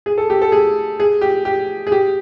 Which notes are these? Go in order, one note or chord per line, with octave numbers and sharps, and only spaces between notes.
G#4
A4
G4
A4
G#4
G#4
G4
G4
G#4
G4